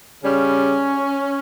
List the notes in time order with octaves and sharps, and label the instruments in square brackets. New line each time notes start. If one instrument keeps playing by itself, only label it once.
[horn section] C#3 G3 C#4